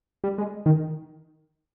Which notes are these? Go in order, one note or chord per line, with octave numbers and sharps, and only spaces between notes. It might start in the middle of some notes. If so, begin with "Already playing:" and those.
G3
G#3
D#3